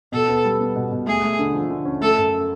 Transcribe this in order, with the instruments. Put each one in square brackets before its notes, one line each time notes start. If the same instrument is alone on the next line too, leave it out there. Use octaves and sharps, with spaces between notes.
[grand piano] B2 [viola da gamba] A4
[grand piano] B3
G3
B3
B2
B2
[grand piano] A3 [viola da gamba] G#4
[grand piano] A3
D3
F3
D3
C#4
[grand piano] A3 [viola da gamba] A4
[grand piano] F#2